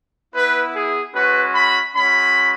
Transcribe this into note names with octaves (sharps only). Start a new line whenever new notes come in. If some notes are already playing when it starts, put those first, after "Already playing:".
B3 E4 B4
G#4
G#3 C#4 F#4 B4
B5
G#3 C#4 F#4 B5